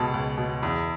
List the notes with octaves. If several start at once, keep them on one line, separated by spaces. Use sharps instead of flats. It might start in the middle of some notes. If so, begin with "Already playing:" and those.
Already playing: C#2 B2 A5 B5
C#2
B2
E2